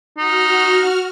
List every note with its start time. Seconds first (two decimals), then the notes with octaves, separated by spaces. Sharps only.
0.18 D#4 F#4 F6